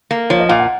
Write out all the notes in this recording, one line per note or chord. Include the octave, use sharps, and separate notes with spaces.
A#3
F3 C#5
D#5
A#2 F5
F#5